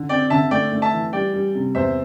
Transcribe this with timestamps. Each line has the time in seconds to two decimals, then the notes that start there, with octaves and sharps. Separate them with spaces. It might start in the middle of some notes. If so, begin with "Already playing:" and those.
Already playing: D3
0.09 C4 D5 G5
0.30 D3 E5 A5
0.51 A3 D5 G5
0.72 A3
0.82 E5 A5
0.93 E3
1.13 G3 D5 G5
1.34 G3
1.55 C3
1.75 E2 C5 E5